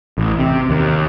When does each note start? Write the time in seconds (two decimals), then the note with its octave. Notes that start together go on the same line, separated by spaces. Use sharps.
0.18 A1
0.39 C3
0.70 D#2